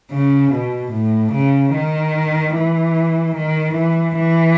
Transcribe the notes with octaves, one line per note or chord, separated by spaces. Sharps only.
C#3
B2
A2
C#3
D#3
E3
D#3
E3
E3